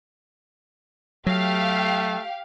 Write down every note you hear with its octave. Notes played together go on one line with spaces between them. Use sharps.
F#3 A3 G4 F5